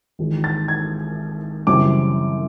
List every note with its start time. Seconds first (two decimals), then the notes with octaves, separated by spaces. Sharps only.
0.19 G#1 G#2 E3 G#3
0.44 A6
0.68 G#6
1.67 F#2 C#3 E3 G3 C4 D6